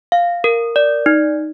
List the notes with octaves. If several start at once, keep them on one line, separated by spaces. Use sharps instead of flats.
F5
A#4
D5
D#4